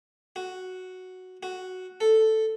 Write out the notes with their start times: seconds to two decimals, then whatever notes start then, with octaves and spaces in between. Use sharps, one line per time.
0.36 F#4
1.43 F#4
2.01 A4